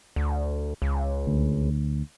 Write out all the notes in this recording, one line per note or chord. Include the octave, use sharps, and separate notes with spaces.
D2
C#2
D2